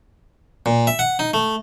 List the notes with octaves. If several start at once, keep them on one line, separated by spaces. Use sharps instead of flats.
A#2
E5
F#5
D#4
A3